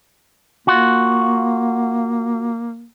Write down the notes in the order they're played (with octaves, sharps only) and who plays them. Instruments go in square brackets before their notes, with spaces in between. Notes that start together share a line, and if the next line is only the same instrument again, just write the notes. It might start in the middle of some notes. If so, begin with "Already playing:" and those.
[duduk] A#3 [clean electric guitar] F4 F#4